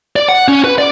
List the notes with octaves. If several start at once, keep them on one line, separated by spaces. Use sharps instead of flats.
D5
F#5
C#4
B4
D5